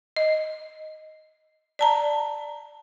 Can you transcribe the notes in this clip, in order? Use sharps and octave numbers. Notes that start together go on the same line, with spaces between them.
D#5
D5 A5 A#5